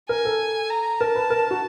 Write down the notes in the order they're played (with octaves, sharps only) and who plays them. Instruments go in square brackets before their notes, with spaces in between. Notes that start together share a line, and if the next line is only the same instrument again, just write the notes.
[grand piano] A#4 [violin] G#5
[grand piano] A4
[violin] A#5
[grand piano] A#4 [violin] A5
[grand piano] B4
A#4
F#4